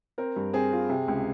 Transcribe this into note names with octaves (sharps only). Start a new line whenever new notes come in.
C4 A#4
G2
C4 G#4
F4
C3
C#2